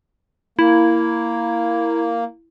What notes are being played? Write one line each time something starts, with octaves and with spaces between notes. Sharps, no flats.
A#3 E4